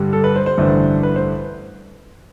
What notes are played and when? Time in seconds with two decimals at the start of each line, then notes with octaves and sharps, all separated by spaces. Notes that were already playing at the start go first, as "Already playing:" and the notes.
Already playing: G2 D3 G3 D4
0.13 A4
0.24 B4
0.36 C5
0.46 C5
0.58 A1 G2 D3 A3 D4
1.03 B4
1.16 C5